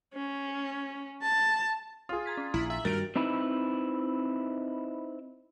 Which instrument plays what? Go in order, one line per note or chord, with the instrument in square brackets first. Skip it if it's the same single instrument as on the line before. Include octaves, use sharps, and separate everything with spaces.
[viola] C#4
A5
[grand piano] F4 G#4
[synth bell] A#5 G#6 B6
C#4
[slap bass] A#1 [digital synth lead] E4 [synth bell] A#5 F#7
[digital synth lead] E5
[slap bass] G2 D#3 G3 [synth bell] F#4 [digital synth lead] A#4 [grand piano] A6 D7
[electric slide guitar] C4 D#4 E4 B4